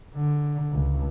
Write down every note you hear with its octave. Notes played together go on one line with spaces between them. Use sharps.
D3
C#2